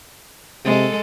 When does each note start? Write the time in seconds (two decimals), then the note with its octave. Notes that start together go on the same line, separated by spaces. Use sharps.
0.65 C3 G#3 A4